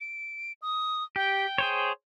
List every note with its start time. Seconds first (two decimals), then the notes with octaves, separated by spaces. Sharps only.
0.01 D7
0.62 D#6
1.16 G4 G5
1.58 G#4 C5 C#5